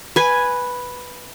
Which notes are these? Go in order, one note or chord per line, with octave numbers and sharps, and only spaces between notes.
B4 G#5